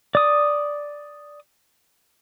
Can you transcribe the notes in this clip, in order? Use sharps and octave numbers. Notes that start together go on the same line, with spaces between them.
D5 D#6